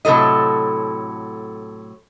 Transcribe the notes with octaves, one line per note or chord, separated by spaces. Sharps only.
A2 C3 F#3 A4 D#5